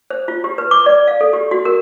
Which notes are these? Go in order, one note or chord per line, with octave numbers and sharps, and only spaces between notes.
C5
F4
G4
B4
D6
D5
F5
A4
G4
F#4
A#4